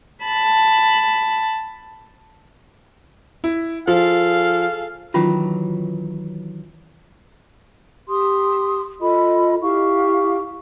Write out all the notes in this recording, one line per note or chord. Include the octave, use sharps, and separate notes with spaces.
A5 B5
E4
F3 G#4 A4 F5
D#3 E3 F#3 C#4 F4
G4 C6 D#6
F4 A4 D#5 B5
E4 G4 F5 C#6